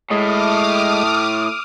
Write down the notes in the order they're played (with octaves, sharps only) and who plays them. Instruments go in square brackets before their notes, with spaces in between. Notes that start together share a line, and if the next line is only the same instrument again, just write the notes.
[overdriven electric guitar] A2 [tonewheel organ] G#3 D#5 [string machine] D6 D#6 F6